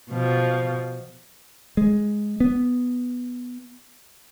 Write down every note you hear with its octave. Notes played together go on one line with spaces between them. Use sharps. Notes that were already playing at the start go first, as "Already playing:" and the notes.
B2 F3
G#3
B3